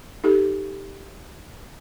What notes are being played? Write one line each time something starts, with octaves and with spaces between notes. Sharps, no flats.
D#4 G4 A4